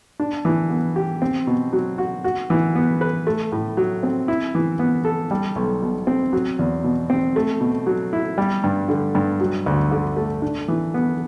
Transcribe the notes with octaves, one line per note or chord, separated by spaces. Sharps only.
D4
E3
B3
G4
C4
B2
F#3
F#4
F#4
E3
B3
B4
A3
A2
F#3
C4
E4
E3
B3
A4
G3
B1
B2
C4
F#3
E2
B2
C4
A3
B2
F#3
E4
G3
G2
D3
G2
F#3
D2
D3
A3
D4
E3
B3